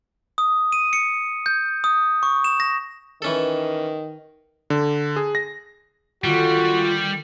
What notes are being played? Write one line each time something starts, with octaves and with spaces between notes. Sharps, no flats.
D#6
D#7
C#7
G6
D#6
C#6
E7
A#6
D#3 E3 C#4 A4
D3
G#4
A#6
D3 D#3 G3 A#3 F4 F#4